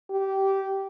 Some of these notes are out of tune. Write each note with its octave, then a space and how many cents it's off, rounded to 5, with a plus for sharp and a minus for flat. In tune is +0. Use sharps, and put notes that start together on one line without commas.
G4 -15